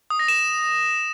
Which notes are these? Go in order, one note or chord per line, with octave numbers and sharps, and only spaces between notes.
D#6
A#6
E7